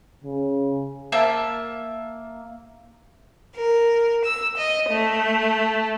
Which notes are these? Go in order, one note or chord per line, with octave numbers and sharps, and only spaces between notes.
C#3
A#3 E5 A5
A#4
E6
D#5
A3